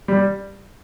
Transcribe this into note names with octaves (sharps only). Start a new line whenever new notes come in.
G3